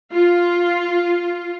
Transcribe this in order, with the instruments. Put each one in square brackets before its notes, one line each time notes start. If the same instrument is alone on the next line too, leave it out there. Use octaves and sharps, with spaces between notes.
[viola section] F4